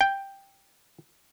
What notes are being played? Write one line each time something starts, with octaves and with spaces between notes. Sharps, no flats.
G5